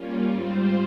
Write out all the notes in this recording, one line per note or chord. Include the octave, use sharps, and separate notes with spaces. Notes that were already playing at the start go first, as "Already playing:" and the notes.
Already playing: G3 A#3 C#4 F4
G#2 G3 C4 F4 C5